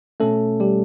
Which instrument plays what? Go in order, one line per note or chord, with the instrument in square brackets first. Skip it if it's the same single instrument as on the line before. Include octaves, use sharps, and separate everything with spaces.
[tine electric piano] B2 A3 C#4 A4
G3 G4